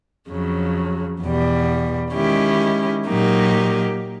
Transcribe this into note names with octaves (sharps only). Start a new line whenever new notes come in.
F2 C#3 F#3
E2 B2 G3
D#3 G#3 C#4 E4 G4
A#2 F#3 A#3 D#4 G4